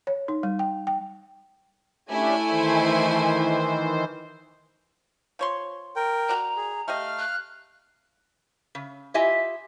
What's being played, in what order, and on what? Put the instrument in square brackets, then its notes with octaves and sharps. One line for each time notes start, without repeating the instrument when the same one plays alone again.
[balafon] C#5
D#4
G3
G5
G5
[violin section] A3 E4 G#5 [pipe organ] C#4 D4 G4
[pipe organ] D#3 E3 C5
[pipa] F3 C#5 C6
[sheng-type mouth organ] A#4 G5
[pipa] F#4 D5 [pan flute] A#5
[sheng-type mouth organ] G#4
[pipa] A3 G4 D#5 [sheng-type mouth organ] F5 F6
[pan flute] F#6
[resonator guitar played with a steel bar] C#3
E4 F4 G4 D#5 E5 G#5